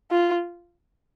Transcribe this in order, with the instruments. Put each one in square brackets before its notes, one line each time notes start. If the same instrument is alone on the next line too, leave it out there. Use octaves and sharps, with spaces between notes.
[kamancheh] F4